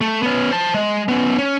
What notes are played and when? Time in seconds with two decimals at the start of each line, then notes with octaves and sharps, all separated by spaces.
0.01 A3
0.23 B3 C#4
0.52 C5 A5
0.74 G#3
1.08 B3 C#4
1.39 C#4